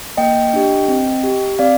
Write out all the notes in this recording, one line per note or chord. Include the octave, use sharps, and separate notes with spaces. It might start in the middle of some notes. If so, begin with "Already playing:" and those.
A#3 D#5 G5
D4 G4
C4
G4
C4 D5 F5